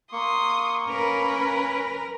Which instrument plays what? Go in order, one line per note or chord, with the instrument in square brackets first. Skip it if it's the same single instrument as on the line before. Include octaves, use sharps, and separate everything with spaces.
[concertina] A#3 C#6 [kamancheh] C6 D#6
[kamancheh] C#4 B4 [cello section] A#4